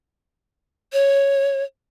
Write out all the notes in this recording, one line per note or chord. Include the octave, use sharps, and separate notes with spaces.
C#5